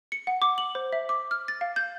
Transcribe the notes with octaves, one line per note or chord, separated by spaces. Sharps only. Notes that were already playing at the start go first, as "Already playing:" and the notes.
C#7
F#5
D6
F#7
C5
E5
D6
F6
A6
F5
G6